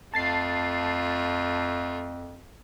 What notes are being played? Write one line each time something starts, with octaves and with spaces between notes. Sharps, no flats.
F2 A3 F4 A5 A6 C7